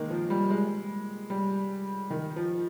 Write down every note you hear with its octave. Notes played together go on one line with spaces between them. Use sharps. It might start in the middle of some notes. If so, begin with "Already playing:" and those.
Already playing: D#3 G#3 A#3
F3
G3
G#3
G3
D#3
F3